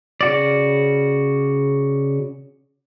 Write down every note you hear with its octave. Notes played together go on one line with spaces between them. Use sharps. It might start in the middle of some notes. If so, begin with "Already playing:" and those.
C#3 F#4 D5